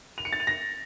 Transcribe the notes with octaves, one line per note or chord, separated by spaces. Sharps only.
F7
C#7
A6
F7
A#6